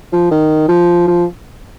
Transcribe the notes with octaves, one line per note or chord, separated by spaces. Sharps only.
F3
D#3
F3
F3